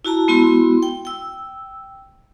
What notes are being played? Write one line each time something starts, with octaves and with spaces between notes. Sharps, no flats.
E4 F#4 A5 A#5
G#3 B3 E4 F#4 C6
G5
G5 E6